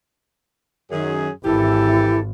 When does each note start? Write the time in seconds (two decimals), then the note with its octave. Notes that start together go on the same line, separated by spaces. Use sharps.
0.91 F#2 D#3 G#4
1.45 G#1 E3 E4 G4 A4